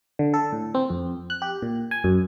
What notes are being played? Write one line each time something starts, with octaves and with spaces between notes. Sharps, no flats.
D3
A4
A2
C4
F2
F#6
G4
A#2
G#5
F#2